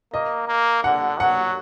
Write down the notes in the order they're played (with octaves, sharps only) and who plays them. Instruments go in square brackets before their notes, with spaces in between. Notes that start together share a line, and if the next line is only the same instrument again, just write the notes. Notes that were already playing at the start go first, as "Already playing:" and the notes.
[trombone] A#3 [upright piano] D#5
[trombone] A#3
[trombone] D3 [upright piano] F#5
[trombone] F#3 [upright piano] F#5